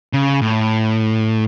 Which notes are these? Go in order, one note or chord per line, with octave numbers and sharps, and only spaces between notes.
C#3
A2